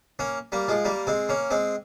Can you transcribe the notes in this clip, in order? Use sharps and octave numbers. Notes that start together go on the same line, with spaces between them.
A#3 C#4
G3 A#3
F3 G#3
G3 A#3
G#3 C4
A#3 C#4
G#3 C4